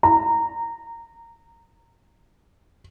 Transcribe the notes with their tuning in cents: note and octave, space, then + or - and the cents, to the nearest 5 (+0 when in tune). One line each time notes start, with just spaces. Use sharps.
A#5 -10